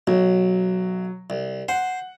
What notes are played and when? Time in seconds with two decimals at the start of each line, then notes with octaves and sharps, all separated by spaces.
0.07 B1 F#3
1.30 C2
1.68 C5 F#5